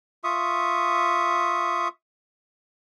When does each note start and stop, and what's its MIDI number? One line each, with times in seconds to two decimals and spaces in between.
0.24 1.88 65
0.24 1.88 76
0.24 1.88 85
0.24 1.88 87